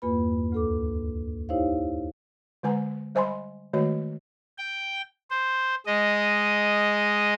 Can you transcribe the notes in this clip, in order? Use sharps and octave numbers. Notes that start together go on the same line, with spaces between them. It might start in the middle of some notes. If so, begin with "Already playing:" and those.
E2 G2 A#3 F4 B4 B5
D2 A4 D6
D#4 E4 G4 C5 C#5 F5
D3 G#3 B4 G#5 A#5
G3 C5 D#5 G#5 B5 C6
D#3 G#3 A3 F#4 C#5 D#5
G5
C5
G#3 D#5